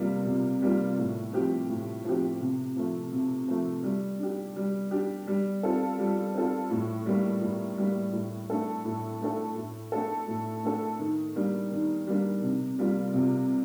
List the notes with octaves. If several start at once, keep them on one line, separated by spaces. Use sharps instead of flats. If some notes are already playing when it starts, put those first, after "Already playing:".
Already playing: C3 G3 A#3 F4
C3
G3 A#3 F4
A2
F3 C4 G4
A2
F3 C4 G4
C3
F3 A3
C3
F3 A3
G3
D4 G4
G3
D4 G4
G3
C4 F4 A4
G3
C4 F4 A4
A2
G3 A#3
A2
G3 A#3
A2
A3 D4 A4
A2
A3 D4 A4
A2
A3 D4 A4
A2
A3 D4 A4
D#3
G3 A#3 D4
D#3
G3 A#3 D4
C3
G3 A#3 F4
C3